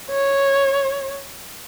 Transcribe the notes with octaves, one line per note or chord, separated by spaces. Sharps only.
C#5